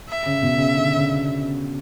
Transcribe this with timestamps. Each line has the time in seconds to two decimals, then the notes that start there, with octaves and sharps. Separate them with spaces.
0.09 E5
0.26 C#3
0.42 B2
0.58 C#3
0.75 D3
0.96 C#3